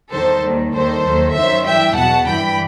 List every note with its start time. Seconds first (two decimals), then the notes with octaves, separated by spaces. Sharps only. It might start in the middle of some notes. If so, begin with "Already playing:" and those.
0.12 E2 D#3 G3 A4 C5
0.42 D#2 D#3 G3
0.73 D#2 D#3 G3 A4 C5
1.04 D#2 D#3 F#3
1.34 F#2 D#3 F#3 C5 E5
1.65 G2 E3 G3 E5 G5
1.96 E2 B2 F#3 F#5 A5
2.27 G2 E3 G3 G5 B5